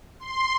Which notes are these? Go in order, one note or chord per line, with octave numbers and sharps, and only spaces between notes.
C6